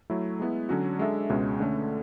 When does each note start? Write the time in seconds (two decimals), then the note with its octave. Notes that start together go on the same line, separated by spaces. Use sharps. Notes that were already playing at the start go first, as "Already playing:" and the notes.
0.10 F#3 A3 E4
0.40 G#3 B3 E4
0.69 D3 F#3 C#4 F#4
0.99 G#3 D4 A4 E5
1.30 C#2 B2 G#3 C#4
1.60 D3 A3 C#4